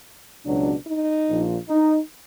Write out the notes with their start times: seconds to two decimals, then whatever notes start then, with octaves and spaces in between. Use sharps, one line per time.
0.44 C#2 B2 F#3 D4
0.86 D#4
1.28 A#1 A#2 F3
1.69 D#4